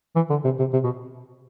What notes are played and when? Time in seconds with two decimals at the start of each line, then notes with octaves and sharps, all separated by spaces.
0.16 E3
0.30 D3
0.45 C3
0.59 C3
0.73 C3
0.84 B2